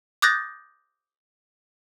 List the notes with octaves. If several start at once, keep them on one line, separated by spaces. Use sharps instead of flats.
D6 D#6 F#6 G6 A6 A#6